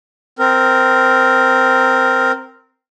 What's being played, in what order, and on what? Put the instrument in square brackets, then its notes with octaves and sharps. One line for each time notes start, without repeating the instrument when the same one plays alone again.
[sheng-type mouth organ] C4 A#4